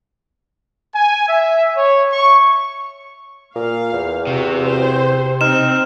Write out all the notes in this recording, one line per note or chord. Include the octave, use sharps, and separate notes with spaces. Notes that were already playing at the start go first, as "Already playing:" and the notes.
G#5
E5
C#5
C#6
A#2 F5
E2
C3 F#4
C5
C4 D#4 F6 E7